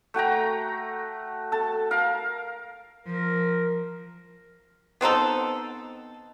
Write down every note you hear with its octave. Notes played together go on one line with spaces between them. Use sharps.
A3 F#4 G5 A#5
A4 A5
A#4 F5
F3 A#4
B3 C4 D#4 A4